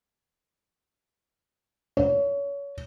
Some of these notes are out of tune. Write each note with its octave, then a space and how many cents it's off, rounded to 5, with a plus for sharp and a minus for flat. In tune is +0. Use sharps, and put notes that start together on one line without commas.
C#5 +25